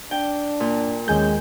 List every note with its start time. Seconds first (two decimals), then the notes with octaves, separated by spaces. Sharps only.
0.11 D4 G5
0.60 A#2
1.08 D#2 G#3 C#4 G#5 G6